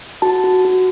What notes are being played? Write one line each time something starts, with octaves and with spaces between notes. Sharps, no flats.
F#4 A5
F#4
F#4